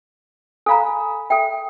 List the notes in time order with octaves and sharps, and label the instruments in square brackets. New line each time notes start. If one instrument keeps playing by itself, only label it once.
[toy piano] A4 F5 A#5 [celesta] G#5 B5
[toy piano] A4 G5 [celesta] E5